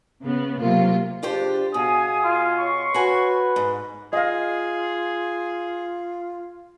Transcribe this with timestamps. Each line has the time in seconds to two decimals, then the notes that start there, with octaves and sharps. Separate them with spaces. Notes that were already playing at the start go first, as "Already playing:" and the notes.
0.23 C#3 B3
0.60 C3 F#3 A#3 F4
1.23 C#3 D4 F4 G4 C5
1.74 B2 G#4 F5 G#5 D#6
2.24 F4
2.57 C#5 C6 C#6
2.94 F#4 B4 G#5
3.56 G#2
4.13 F4 G#4 D#5 F5